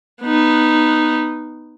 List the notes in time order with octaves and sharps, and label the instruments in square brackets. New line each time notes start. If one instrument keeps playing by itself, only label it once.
[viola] B3 D#4